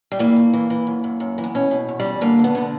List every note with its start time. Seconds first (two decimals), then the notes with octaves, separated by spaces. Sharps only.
0.12 G3
0.19 E3 A#3
0.36 G2
0.54 E3
0.70 E3
0.87 F#2
1.04 F#2
1.20 F#2
1.38 E3
1.44 B3
1.55 B2 C#4
1.71 B2
1.89 E2
2.00 E2 G3
2.21 D3 A#3
2.39 D2
2.44 B3
2.55 D3